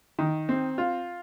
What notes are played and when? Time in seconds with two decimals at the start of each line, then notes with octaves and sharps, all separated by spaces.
0.19 D#3
0.49 C4
0.78 F4